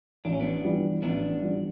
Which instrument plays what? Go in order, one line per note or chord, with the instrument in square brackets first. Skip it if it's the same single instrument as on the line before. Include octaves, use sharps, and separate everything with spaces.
[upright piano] A1 [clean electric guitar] D4
[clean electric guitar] C#4
B3 D4
[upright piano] G2 E3 G3
[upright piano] A1 [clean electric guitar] B3 D4
[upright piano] G2 E3 G3